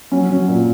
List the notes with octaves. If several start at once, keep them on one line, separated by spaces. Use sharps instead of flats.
F#3 C#4
F#3
A#2